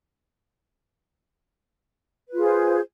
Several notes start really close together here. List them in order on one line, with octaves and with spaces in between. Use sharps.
B4 F4 G#4 C5